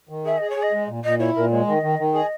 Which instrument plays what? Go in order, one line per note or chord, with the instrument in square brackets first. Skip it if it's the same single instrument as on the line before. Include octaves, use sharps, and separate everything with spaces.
[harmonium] D#3
[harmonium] G#4 [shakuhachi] E5
[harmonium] G#4 [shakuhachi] D#5
[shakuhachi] C#5
[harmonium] G#4
[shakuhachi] D#5
[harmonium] G#3
A#2
[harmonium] A#2 [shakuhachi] D#5
[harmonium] E4 [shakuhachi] C#5
[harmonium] A#2 [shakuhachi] A#4
[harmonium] G#3 [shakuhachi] C#5
[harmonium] D#3 [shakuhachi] D#5
[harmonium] D#3
D#3
[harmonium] G#4 [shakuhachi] D#5